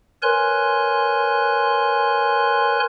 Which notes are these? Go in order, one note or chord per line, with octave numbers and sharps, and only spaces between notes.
A#4 B4 C#5 G#5 C6 F#6